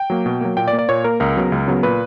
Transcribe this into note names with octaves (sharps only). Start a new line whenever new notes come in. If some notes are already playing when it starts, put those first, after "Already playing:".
Already playing: G5
F#3 A#3
B2
F#3 A#3
A#2 G5
D5
A#3
D5
A#2 C#5
A#3 A#4
C#2 A#4
C#3 F#3 B3
C#2
C#3 F#3 B3
A#2 B4